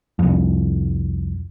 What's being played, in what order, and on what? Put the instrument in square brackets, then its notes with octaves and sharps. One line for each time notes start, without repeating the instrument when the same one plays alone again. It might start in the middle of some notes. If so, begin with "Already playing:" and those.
[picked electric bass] C2 F2